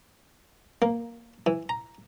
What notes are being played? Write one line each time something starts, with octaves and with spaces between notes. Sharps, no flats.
A#3
E3
A#5